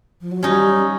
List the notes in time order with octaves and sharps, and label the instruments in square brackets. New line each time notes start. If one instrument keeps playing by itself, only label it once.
[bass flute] F3
F#3
[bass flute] G3 [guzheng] C#4 D#4